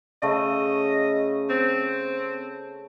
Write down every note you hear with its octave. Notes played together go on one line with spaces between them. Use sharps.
C#3 A3 D#5
C4